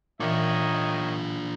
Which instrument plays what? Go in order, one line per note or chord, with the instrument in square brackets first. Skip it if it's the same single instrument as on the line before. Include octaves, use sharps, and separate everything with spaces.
[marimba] A#2 E3 [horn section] D#3 C#5 D#5 [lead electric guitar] D4 F4